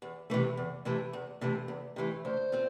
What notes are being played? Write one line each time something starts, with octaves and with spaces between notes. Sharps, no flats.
E2
C3 E3 A3
E2
C3 E3 A3
E2
C3 E3 A3
E2
C3 E3 A3
D2 C5
C4 F4